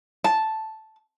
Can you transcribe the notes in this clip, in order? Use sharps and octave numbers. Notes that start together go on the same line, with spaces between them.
A5